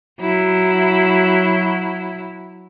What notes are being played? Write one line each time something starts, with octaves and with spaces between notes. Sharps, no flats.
F#3 E4